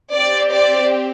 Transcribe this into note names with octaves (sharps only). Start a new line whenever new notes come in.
C4 G4 D5
D5